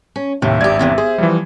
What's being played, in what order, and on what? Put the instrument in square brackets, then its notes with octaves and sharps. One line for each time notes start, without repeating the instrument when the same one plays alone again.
[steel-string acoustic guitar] C#4
[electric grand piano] D#2 [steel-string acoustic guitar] A2 C3 [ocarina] E5
[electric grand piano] G#1 D5 G#6 [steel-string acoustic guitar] G2 G4
[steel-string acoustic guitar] E2 C3 E3
[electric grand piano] G#4 [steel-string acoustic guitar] C5
[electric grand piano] E3 F3 G3